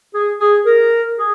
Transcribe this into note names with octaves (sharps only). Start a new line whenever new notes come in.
G#4
G#4
A#4
G#4